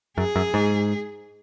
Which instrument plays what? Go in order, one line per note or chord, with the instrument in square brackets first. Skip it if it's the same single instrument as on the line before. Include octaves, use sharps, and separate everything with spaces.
[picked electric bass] F#2 [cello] G#4
[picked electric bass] F#2
G#2